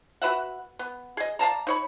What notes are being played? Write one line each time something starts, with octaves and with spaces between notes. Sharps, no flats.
F#4 B4 E5 F#5
B3
G#4 D#5
D5 F5 A5 A#5
D#4 C#5 B5